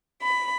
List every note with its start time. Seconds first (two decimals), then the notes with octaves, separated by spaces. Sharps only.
0.22 B5